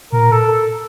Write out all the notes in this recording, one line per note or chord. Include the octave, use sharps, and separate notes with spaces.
A#2 A#4
A4